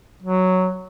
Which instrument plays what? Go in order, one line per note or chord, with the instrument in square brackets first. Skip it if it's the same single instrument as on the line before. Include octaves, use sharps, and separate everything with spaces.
[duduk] F#3